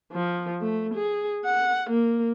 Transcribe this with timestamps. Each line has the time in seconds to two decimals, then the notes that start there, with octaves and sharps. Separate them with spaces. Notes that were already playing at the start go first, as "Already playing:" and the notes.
0.12 F3
0.61 A3
0.94 G#4
1.45 F#5
1.90 A#3